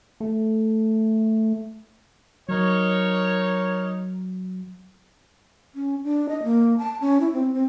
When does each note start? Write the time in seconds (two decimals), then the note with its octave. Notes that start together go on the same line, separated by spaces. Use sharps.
0.20 A3
2.49 F#3 D#4 A#4 C#5
5.75 C#4
6.04 D4
6.29 D#5
6.43 A#3
6.79 A5
7.01 C#4
7.20 E4
7.33 C4
7.54 C4